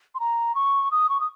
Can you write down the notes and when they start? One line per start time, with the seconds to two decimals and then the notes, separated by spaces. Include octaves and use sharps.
0.15 C6
0.20 A#5
0.55 C#6
0.91 D#6
1.09 C#6
1.20 D#6